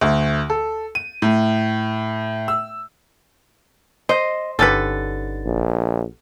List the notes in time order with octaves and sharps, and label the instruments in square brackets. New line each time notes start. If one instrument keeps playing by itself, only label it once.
[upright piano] D2
A4
D#7
A2
E6
[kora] C5 [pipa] D#5
[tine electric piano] G1 D#4 A6 [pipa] D3 G3 C#4 [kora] A4 B4
[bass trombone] A#1